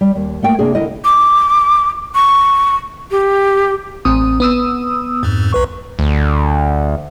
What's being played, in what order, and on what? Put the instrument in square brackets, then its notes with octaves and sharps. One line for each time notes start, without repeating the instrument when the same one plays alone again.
[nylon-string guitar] G3
D#2
A3 A#3 G5
C3 A#3 D4 G#4
D3 E4 A#4 D#5
[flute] D6
C#6
G4
[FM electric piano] A1 C4 D#6
B3 D#6 E6
[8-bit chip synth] F2 G#2
B1 B4 C#6
[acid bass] D2